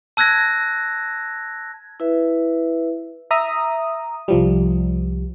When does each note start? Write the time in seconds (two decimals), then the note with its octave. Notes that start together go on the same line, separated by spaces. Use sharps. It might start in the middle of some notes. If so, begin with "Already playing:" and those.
0.17 A5 E6 F#6 G#6 A#6
2.00 E4 B4 E5
3.31 E5 A#5 D#6
4.28 C2 F3 G3